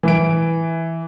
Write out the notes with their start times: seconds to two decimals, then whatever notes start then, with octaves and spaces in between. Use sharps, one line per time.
0.03 E3 D7